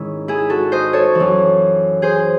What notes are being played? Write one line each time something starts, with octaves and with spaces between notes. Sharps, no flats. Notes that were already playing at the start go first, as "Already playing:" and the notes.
Already playing: G#2 D#3 C#4 E4
E4 G#4
F#4 A4
C5 D#5
A4 C#5
E3
F#2
G#4 C5